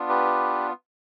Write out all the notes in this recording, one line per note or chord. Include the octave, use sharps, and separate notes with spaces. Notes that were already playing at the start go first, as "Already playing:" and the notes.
Already playing: B3 D4 F4
G4 B4